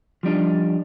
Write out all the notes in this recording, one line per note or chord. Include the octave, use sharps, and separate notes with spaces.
F3 G3 D4 D#4